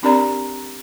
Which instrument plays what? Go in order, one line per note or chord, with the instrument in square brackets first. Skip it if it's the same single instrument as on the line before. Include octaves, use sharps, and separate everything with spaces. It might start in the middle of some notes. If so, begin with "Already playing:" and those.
[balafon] C4 D4 G4 A#4 D5 A#5